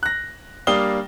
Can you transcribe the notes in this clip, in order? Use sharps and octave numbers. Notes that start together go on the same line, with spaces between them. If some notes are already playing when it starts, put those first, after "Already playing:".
F#6 A#6
G3 A#3 D4 F5 D#6 G7